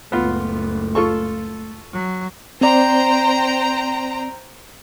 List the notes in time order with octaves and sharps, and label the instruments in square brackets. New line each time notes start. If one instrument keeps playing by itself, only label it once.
[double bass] F#1 C#2 [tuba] A3 [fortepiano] B3 F4
[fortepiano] F4 A4 C#6
[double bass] F#3
[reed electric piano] C4 D5 [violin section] C5 G5 A#5